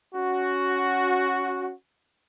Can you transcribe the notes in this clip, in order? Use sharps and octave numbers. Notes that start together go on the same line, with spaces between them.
C#4 F#4